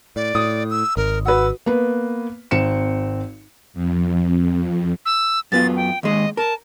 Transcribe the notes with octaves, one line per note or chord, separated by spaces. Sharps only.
A2 D5
A2 D#6
E6
G#1 A#4
F#4 B4 E6
A#3 B3 B4
G#1 C4 C#7 E7
F2
E6
F#2 B3 F4 A6
G5
D#2 G#3 D#5
A#4 A5